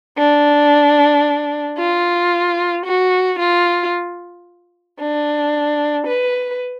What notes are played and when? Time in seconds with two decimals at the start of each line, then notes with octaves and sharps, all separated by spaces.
0.18 D4
1.78 F4
2.86 F#4
3.39 F4
5.00 D4
6.07 B4